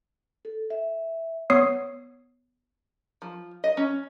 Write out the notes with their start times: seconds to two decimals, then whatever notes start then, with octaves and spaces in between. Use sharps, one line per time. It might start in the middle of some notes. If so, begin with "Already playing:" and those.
0.45 A4
0.70 E5
1.50 B3 C#5 D#6 C7
3.22 F3
3.64 D#5
3.77 C#4